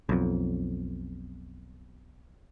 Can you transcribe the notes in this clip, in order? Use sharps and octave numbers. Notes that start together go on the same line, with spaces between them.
B1 F2